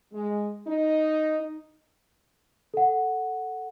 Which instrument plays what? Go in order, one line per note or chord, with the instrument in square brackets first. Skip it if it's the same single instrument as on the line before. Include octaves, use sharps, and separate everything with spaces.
[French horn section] G#3
D#4
[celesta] A4 F#5